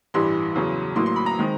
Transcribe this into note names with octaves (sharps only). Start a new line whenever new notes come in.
A1 G2 E3 G3 C6
E2 C#3 F#3
A1 A2 F#3 A#3 C6
C6
B5
A#5
D#3 G#3 C4